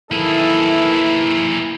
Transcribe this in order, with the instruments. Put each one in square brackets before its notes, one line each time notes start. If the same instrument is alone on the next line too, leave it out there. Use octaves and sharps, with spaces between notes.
[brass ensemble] D#3 E3 A4 [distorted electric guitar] A#3 G#4 [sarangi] E4